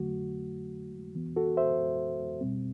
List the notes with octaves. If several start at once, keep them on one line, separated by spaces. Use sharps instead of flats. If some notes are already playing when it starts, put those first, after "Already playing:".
Already playing: D3 F#3 A3 F#4
E3 B3
F#4 A4
C5 E5
B2 G3 C4